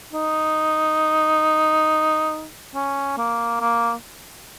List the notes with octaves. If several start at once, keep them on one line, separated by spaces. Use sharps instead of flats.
D#4
C#4
A#3
A#3